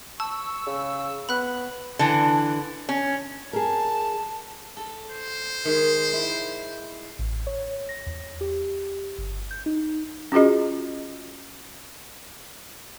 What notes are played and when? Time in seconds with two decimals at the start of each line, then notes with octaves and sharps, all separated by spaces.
0.20 A5 C#6 E6
0.66 C#3
1.29 B3 B5 F#6
1.99 D3 E3
2.89 C#4
3.53 G#4 A#4 A5
4.77 A4
5.10 C5
5.65 D#3 G#3
6.13 E4
7.19 A1
7.47 C#5
7.89 A#6
8.06 E2
8.41 G4
9.18 G1
9.51 G6
9.66 D#4
10.32 C#4 F4 F#4 G#4 D#5